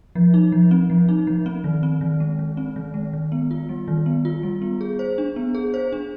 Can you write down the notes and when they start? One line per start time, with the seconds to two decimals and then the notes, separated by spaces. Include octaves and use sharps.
0.15 F3
0.34 D#4
0.52 F3
0.71 C4
0.90 F3
1.09 D#4
1.27 F3
1.46 C4
1.64 D#3
1.83 C4
2.01 D#3
2.20 G#3
2.39 D#3
2.57 C4
2.76 D#3
2.94 G#3
3.13 D#3
3.32 B3
3.51 F4
3.69 G3
3.88 D#3
4.06 B3
4.25 F4
4.43 G3
4.62 B3
4.81 G#4
4.99 C5
5.18 D4
5.36 B3
5.55 G#4
5.74 C5
5.92 D4